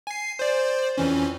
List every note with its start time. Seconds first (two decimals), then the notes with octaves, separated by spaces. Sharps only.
0.07 G#5 C7
0.39 C5 D5
0.98 F2 E3 C#4